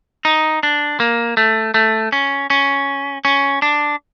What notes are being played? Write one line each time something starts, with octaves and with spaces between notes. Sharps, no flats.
D#4
D4
A#3
A3
A3
C#4
C#4
C#4
D4